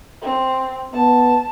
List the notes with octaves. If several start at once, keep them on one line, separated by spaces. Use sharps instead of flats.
C4
B3 A5